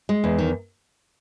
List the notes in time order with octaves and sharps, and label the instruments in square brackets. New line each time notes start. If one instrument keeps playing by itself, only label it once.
[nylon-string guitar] G#3
E2
D#3